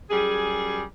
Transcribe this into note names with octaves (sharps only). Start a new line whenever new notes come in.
F#2 G3 G#4